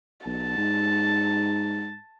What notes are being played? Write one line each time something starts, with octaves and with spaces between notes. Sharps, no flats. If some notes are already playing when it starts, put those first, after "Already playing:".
B1 A5
G#2